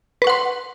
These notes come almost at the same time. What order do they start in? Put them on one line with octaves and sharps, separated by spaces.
B4 C#6 F#5 C6